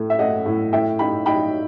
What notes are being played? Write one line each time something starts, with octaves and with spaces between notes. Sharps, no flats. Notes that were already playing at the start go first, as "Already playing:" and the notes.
Already playing: A2 A3
E5
A3 D#5 F#5
A2
A2 E5 G5
D#4 G5 B5
D#4 G5 B5